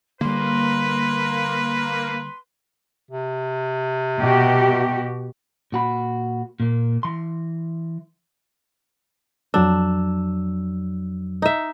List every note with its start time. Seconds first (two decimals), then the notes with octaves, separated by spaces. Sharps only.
0.21 D3 G3 A#3 B4 C6
3.11 C3
4.21 B2 F#4 G4
5.72 A#2 F#4 B5
6.60 A#2 A#3
7.03 E3 C6
9.54 F2 F#3 D4 E6
11.42 D#4 E5